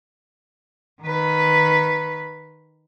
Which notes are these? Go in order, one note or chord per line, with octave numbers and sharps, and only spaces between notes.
D#3 B4